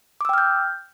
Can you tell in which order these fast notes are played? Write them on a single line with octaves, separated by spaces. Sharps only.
D6 E6 G5 F6 G6